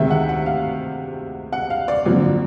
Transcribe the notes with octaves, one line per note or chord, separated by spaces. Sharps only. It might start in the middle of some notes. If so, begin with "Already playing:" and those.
Already playing: D2 C3 D#3 G#3 E5
F#5
F#5
F5
F#5
F5
D5
G#1 F#2 D3 F3 A#3